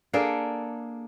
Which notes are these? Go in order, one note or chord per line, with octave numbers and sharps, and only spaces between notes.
A#3 D4 G#4 A4